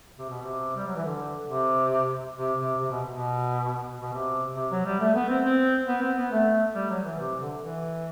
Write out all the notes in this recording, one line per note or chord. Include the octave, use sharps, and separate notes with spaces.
C3
B2
C3
G3
F#3
E3
D3
C3
C3
C3
C3
B2
B2
B2
C3
C3
F#3
G3
A3
B3
C4
C4
B3
C4
B3
A3
G3
F#3
E3
C3
D3
E3